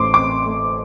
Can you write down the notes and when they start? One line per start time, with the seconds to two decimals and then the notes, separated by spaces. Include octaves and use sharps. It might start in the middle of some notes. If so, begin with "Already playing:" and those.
Already playing: A1 A3 C6 D6
0.14 C4 D6
0.45 A3